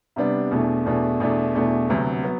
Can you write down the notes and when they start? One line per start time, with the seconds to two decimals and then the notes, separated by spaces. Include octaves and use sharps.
0.16 C3 G3 B3 D4
0.51 E2 B2 A3 D4
0.85 E2 B2 A3 D4
1.20 E2 B2 A3 D4
1.55 E2 B2 A3 D4
1.89 D2 C3 F#3 B3
2.23 F#3 B3